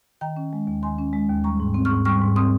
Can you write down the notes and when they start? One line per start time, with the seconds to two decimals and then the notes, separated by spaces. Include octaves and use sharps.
0.21 D#3 G5 A#5
0.36 C#4
0.53 G#3
0.67 D#2
0.82 D#3 G#5 C6
0.99 C#4
1.13 G#3
1.29 D#2
1.44 G3 A#5 C#6
1.60 G#2
1.74 C4
1.85 C#6 F6
1.91 G#2
2.05 G3 C#6 F6
2.21 G#2
2.36 C4 C6 D#6